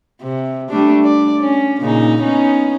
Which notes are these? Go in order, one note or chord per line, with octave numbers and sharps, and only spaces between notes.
C3
G3 A3 D4
D5
C#4
A#2 C#3 D#4
B3 C#4 D#4